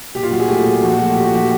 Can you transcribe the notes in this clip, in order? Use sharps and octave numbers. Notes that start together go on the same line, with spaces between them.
A#2 G4
F4
F#3 F#4
G#4
A3 G4
A#2
F3 F#4
A3 F#4
A#2 G4
F#4
F3 G4